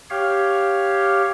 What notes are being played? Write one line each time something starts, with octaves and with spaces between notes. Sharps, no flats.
G4 C#5 F5